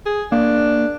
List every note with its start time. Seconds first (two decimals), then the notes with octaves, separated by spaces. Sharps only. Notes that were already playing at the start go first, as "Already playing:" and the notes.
0.06 G#4
0.32 A#3 D4